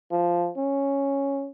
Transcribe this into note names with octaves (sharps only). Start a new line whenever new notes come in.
F3
C#4